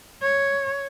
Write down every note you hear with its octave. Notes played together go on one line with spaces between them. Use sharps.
C#5